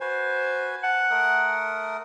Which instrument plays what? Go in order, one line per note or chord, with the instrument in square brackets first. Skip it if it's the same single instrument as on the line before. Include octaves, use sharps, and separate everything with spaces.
[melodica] F#4 B4 G#5 [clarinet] C5
[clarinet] F#5 [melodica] A5
[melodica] A3 A#4 D#6